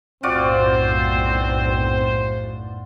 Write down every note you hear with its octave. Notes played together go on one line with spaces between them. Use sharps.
B1 F#2 A2 C4 F4 F#4 C5 D5